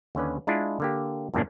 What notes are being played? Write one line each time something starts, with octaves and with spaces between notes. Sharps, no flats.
D#2 D3 C#4 B4
G#3 D4 E4 F4
D3 A#3 G4
E2 G2 A#2 A#3 C#4 D4